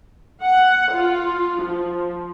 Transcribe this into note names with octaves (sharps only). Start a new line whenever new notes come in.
F#5
F4
F3